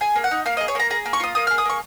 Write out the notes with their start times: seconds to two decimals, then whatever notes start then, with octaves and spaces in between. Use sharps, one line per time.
0.01 G#4 G#5
0.16 A#3
0.24 F#5
0.31 D#4
0.46 A#3 F5
0.57 D#5
0.60 G#4
0.68 C#5
0.75 A#3 A#5
0.90 G#4 A#5
1.06 A#3
1.13 C#6
1.20 F4 D#6
1.35 A#3 D#6
1.47 F6
1.51 G#4
1.58 D#6
1.65 A#3 C#6